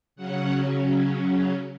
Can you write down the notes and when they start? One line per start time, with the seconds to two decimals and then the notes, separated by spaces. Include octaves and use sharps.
0.16 C#3 F#3 C#4 F#5